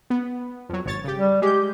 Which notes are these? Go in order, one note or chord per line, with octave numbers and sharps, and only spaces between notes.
B3
F2 F#3
G#1 C#5 A6
C#3 G4
G3
G#3 G4 G6